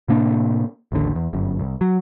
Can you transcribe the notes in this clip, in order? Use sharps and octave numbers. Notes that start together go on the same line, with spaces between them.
A2 C3 A#3 D4
A1 D#2 D3
E2
G1 F#2
C2
F#3